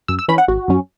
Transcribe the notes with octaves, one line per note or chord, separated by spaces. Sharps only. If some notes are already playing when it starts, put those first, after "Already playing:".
F#2 E6
E6
E3 C#4 B5
F#5
G#1 F#4
F#2 F#3 C#4